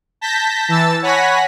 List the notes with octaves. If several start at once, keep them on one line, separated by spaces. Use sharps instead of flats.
A5 G6 A#6 B6
E3 A5 E6 A6
C#5 F#5 G#5 B5 A#6 B6